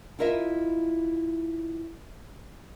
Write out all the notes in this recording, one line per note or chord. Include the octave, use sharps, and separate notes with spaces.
E4 F4 A#4 D#5 E5